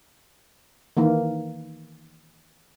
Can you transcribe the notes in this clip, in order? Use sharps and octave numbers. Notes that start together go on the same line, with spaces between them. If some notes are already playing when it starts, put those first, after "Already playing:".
D#3 E3 A#3